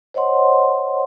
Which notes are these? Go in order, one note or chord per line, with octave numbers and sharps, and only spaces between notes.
C5 C#5 D#5 F#5 C6